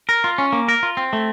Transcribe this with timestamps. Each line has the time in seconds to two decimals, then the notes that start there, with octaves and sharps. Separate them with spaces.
0.09 A#4
0.24 F4
0.38 C#4
0.53 A#3
0.68 A#4
0.83 F4
0.97 C4
1.13 A3